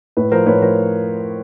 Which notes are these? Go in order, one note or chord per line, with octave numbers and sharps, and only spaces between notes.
A2 B4
F3 A#4 C5
A2 B4 C#5
F3 A#4 C5